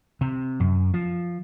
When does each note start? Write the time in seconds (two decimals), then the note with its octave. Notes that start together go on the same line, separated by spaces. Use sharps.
0.21 C3
0.60 F#2
0.94 F3